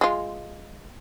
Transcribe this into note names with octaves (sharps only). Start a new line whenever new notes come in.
G#3 F4